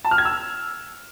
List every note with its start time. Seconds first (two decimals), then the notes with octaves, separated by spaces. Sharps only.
0.05 A5
0.11 F6
0.18 G#6
0.25 E6